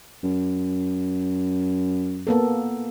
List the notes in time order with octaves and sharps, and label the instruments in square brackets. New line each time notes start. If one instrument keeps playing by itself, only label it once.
[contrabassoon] F#2
[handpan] A#3 B3 A4